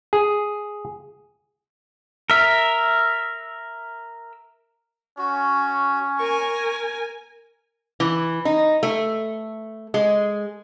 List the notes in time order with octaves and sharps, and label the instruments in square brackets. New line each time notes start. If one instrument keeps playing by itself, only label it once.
[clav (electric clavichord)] G#4
[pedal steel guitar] A#4 E5
[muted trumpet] C#4 [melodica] F#4
[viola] A#4 G#5 [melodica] C#6
[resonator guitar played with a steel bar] E3
D#4
A3
G#3